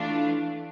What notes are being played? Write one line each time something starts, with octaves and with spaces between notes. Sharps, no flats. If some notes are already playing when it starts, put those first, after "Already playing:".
Already playing: E3 A3 D4 F4